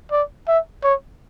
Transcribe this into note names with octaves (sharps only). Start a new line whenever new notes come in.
D5
E5
C#5